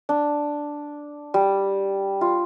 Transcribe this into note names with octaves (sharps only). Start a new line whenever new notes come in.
D4
G3
F4